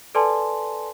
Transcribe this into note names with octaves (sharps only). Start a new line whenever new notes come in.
A4 B4 D5 G#5 A5 C6